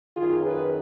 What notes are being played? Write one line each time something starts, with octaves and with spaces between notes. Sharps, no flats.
F#2 D#3 F4 G#4
G#4 B4